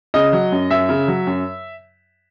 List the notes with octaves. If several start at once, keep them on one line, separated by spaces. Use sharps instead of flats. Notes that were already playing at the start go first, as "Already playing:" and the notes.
C#3 D#5
F#3
F#2
F#2 E5
C#3
F#3
F#2